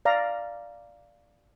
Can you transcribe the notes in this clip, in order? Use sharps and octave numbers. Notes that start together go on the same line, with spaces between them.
D5 F5 A#5